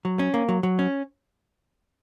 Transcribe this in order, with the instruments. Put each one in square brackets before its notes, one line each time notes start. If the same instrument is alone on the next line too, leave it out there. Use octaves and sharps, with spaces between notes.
[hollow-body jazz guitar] F#3
C#4
A#3
F#3
F#3
C#4